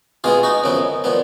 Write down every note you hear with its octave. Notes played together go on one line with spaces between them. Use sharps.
B2 G#3 B3 F4 G#4
D#4 F#4
F#2 C#3 F3 B3
A#2 F3 B3